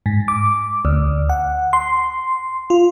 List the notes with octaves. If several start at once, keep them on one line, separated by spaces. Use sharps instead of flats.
G#2
D6
D2
F#5
C6
F4